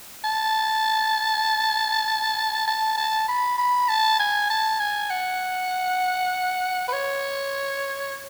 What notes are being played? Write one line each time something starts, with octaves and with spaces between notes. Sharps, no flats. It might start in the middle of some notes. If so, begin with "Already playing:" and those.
A5
A5
A5
B5
B5
A5
G#5
A5
G#5
F#5
B4
C#5